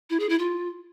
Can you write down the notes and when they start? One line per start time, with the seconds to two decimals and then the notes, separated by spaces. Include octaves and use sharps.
0.10 E4
0.20 G#4
0.29 E4
0.39 F4